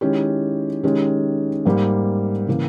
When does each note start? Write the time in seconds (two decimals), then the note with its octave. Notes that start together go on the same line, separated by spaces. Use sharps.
0.01 D#3 G#3 C#4 E4 G4
0.84 D#3 G#3 C#4 G4
1.65 G#2 G3 A#3
2.47 C#3 E3 A#3